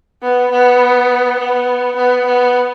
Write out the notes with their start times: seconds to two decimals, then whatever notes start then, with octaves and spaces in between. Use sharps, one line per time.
0.22 B3
0.51 B3
1.39 B3
1.96 B3
2.26 B3